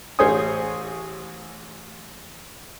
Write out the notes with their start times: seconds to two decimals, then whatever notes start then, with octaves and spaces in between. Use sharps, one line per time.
0.19 A1 G#4 C5 C#5 G#5 D#6